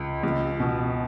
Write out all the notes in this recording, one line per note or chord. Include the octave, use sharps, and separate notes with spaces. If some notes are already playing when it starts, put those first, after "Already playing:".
Already playing: C#2
C#2
B2